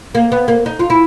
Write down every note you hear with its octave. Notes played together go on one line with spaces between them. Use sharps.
A#3
B3
A#3
D#4
F4
E4